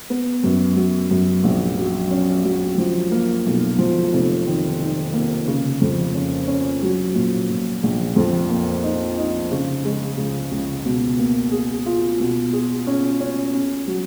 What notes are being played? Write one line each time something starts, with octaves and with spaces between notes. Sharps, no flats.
B3
F#2
F#3
F#2
A#1
F#3
C#4
F#3
F3
A#3
B1
F3
F1
D#3
D#3
A#3
C#3
F2
C#4
C#4
F#3
A#2
A#2
A#1
F2
A#3
D#4
D#4
C#3
G#3
C#2
C#2
B2
A#3
G#4
F4
B2
G#4
C#4
C#4
C#4
F#3